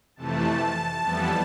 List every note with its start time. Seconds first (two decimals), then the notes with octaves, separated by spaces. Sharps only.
0.16 F2 C3 E3 A3 A5
1.00 F2 E3 G3 B3